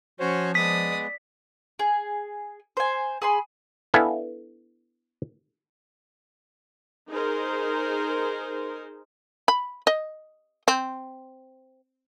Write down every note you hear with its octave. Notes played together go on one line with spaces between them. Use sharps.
F3 C#4 F#4 C5 C#5
G#3 B3 D5 D#6 B6
G#4
C5 G#5
G#4 B5 C6
B3 D4 E4 A4 F5 G#5
D#4 G#4 A#4 C5
B5
D#5
C4